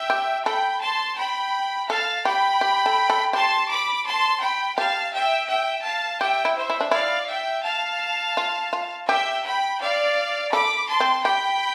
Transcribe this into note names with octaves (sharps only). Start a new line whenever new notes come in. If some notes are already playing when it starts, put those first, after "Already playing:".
Already playing: E5 G5
G4
A4 G5 B5
A5 C6
G5 B5
A4 F5 A5
G4 G5 B5
G4
A4
A4
G4 A5 C6
B5 D6
A5 C6
G5 B5
G4 F5 A5
E5 G5
E5 G5
F5 A5
G4 E5 G5
E4
C5 E5
E4
D4
E4 D5 F5
E5 G5
F5 A5
F4
F4
G4 E5 G5
G5 B5
D5 F5
A4 B5 D6
A5 C6
C4
G4 G5 B5